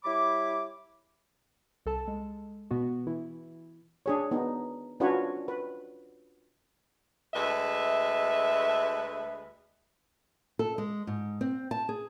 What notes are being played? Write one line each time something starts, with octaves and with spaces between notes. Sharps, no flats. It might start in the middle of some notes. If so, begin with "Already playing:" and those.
G3 E4 C#5 B5 D6
C2 A4 A5
G#3
B2 B3 F#4
E3 E4
D4 G#4 C#5
B3 D#4
C#4 D4 F4 F#4 B4 C#5
B4
D2 G#3 B4 E5
A4
G#3
G#2
C4
A5
G#4